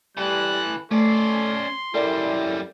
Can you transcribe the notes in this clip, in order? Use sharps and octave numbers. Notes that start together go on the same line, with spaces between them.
E3 G3 A4 F#6
A3 C#4 A4 D5 C6
F#2 G3 E4 A4 A#4 D5